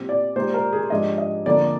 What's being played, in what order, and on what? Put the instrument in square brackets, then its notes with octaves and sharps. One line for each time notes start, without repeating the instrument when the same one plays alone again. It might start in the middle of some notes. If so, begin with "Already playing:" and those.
Already playing: [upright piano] A#2 G3 C4
[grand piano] D5
[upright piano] A#2 G#3 D#4 G4 [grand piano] C5
[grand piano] A#4
G#4
[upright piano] G#2 F3 G#3 D4 G4 [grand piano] D#5
[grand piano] D#5
[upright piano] F2 D3 F3 A#3 D4 [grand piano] D5